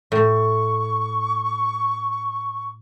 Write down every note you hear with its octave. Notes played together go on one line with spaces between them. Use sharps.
A2 C#6